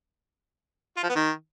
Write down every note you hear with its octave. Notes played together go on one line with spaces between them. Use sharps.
F4
F3
B3
D#3